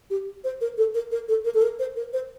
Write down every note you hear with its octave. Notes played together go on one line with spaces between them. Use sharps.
G4
C5
A#4
A4
A#4
A#4
A4
A#4
A4
A#4
C5
A#4
C5